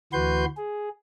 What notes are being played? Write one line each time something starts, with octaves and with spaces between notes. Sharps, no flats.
D2 E3 F#4 B4 C6 G6
G#4